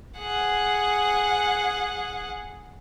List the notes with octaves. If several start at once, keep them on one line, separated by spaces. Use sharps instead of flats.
G#4 F#5